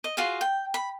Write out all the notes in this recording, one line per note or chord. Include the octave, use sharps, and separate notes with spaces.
D#5
F4 F#4 G#4 F5
G5
B5